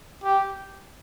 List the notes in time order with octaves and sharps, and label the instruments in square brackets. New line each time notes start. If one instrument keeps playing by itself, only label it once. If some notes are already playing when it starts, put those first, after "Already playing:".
[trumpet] G4